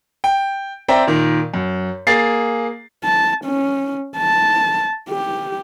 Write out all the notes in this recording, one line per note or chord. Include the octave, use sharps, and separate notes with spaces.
G5
C4 D5 E5 G5 A#5
A#2 D#3
F#2
A#3 G#4 A6 C7
A5
C#4
A5
G4